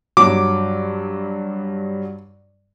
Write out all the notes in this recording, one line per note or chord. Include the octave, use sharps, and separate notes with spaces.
G2 F#3 D6